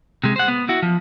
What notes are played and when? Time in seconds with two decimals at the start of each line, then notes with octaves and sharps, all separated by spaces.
0.24 C3 G#3
0.36 C5 F#5
0.48 B3
0.69 E4 F#4
0.82 F3